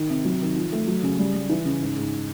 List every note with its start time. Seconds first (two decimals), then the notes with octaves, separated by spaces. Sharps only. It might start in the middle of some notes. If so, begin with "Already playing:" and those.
Already playing: D#3
0.09 C3
0.25 F#3
0.41 D#3
0.56 F3
0.72 A3
0.87 F#3
1.03 C#3
1.18 G3
1.34 G3
1.49 E3
1.65 C#3
1.80 G#2
1.96 G#2